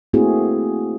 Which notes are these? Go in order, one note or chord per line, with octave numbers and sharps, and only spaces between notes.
A3 A#3 C4 E4 F#4 G#4